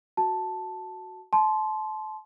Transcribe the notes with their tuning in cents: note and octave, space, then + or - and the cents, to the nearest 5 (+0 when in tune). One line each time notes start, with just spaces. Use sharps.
F#4 +0 A5 +0
A5 -30 C6 +0